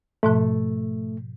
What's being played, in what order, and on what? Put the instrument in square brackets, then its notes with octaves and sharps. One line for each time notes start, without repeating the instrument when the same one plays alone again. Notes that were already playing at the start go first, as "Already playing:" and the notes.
[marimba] G#2 B2 F3 [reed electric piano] A3